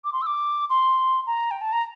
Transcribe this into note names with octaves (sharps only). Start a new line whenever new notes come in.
D6
C6
E6
D6
C6
A#5
G5
A5
A#5